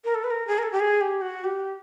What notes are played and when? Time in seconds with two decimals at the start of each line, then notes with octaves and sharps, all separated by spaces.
0.04 A#4
0.15 A4
0.24 B4
0.30 A#4
0.47 G#4
0.58 A#4
0.63 A4
0.72 G4
0.80 G#4
1.01 G4
1.22 F#4
1.44 G4